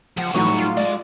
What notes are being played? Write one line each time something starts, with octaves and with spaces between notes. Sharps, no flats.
C#2 F3 F#5
A2 E3 F#3 G3 D#4 C#6
F4
G#3 D5